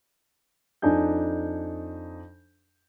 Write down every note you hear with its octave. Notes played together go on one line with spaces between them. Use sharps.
F2 D4 D#4 G#5 G6